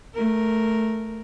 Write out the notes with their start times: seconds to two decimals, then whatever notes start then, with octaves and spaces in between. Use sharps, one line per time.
0.15 A3 A#4